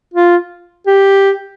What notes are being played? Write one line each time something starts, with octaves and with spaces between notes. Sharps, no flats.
F4
G4